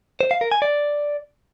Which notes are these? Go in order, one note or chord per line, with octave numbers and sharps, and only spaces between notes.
C5
F5
A#4
G#5
D5